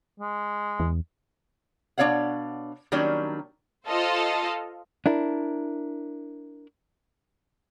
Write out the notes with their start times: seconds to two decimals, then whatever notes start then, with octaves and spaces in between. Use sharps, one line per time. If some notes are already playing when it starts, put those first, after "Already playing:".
0.20 G#3
0.80 E2
1.98 B2 D4 E4 C#5 F5 F#5
2.92 D#3 F#3 G3 A#3 C#4 D4
3.87 F4 A4 C5 D#5 F5
5.06 D4 E4 A#4